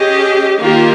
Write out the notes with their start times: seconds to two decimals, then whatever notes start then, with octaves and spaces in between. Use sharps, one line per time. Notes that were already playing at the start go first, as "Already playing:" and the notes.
Already playing: C#4 G4 G#4 D#5
0.60 D#3 A#3 F4 G4 A#4